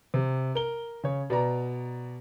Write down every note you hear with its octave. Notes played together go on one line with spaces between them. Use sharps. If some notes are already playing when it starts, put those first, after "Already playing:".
C3
A#4 G7
C#3 C#5
B2 D5 A#5